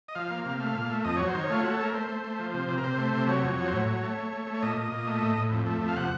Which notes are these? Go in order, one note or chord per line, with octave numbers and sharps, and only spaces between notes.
D#5
F3 F5
A#3
C3
A3
A#2
A3
F2 D#5
F#3 C#5
C5
D#3 C#5
A3 F4
A3 F#4
A4
A3 A#4
A3 C5
A3
A3
F3
C3
C3
A#4
C3 C5
A3
C3
F#3 C#5
F2
F#3
C5
A2 C#5
F#3
A3
A3
A3
A3
C#5
A#2 D#5
A#2
A#2
A3
A2
A2
F2
A3
F2
F5
C3 F#5